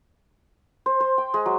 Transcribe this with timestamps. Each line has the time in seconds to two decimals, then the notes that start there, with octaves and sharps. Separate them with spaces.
0.86 C5
1.00 C5
1.18 G5
1.34 G#3
1.46 F#3